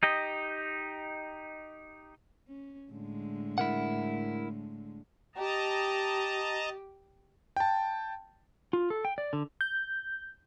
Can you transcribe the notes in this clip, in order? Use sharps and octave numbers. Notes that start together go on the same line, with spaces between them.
D#4 G4 D#5
C#4
A2 D3 G#3
E4 A#4 F#5
G4 D#5 A5 A#5
G5 A5
F4
A4
G5
D5
D3
G6